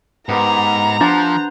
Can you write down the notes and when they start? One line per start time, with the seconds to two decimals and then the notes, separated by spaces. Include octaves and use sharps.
0.29 G#2 B3 G4 A#4 A#5
1.01 F3 D4 C5 F#5 A5